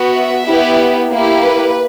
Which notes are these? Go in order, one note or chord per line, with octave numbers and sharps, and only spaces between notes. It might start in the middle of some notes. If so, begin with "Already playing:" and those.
Already playing: B3 F#4
E5
B3 E4 G4
A#3 E4 G4
B4